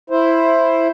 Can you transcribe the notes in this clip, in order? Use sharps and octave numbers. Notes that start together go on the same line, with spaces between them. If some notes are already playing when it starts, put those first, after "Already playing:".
E4 C5